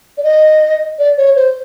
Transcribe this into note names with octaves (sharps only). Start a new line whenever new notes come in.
D5
D#5
D5
C#5
C5